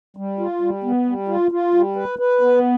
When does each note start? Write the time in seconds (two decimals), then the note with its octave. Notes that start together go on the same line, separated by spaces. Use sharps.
0.17 G3
0.39 F4
0.61 G3
0.84 B3
1.06 G3
1.28 F4
1.51 F4
1.74 G3
1.96 B4
2.19 B4
2.41 B3